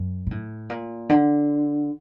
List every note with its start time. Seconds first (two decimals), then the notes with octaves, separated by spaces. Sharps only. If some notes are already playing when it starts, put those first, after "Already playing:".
Already playing: F#2
0.27 A#2
0.31 A2
0.70 A#2
1.10 D3